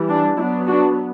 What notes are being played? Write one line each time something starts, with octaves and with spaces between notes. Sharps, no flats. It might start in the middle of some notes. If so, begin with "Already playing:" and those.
Already playing: E3 G3
D4
F#3 B3 D4 E4
D4 F#4